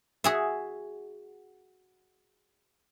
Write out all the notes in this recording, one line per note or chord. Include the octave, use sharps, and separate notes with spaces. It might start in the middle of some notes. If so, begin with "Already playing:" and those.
F#4 G#4 E5